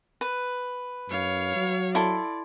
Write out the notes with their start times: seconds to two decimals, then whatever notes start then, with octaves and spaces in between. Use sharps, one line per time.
0.21 B4
1.10 F#2 C#5 F5
1.56 F#3
1.95 E4 A4 D5 C6